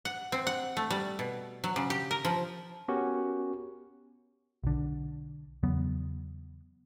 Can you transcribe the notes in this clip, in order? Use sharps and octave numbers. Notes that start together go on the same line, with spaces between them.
F#5
C4
F#5
A3
G3
B2
F#3
C#3
G4
A#4
F3
B3 C#4 F#4 G4 A#4
B1 D3
E2 C#3 F#3 B3